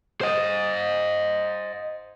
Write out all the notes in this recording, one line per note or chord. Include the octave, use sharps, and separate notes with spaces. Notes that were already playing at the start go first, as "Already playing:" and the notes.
C5 D#5